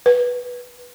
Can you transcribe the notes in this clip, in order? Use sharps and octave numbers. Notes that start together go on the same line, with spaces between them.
B4